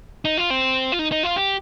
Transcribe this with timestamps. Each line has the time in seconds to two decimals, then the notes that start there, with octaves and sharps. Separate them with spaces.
0.25 D#4
0.38 F4
0.50 C4
0.92 F4
0.99 D#4
1.12 D#4
1.23 F4
1.36 G4